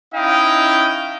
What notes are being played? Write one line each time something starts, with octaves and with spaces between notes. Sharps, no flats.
C#4 D#4 E4 D#5 F5 G5